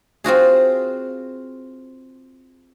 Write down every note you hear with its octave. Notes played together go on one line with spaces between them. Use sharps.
C4 F4 F#4 G#4